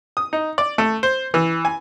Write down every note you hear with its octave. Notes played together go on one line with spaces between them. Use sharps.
D#6
D#4
D5
A3
C5
E3
G#5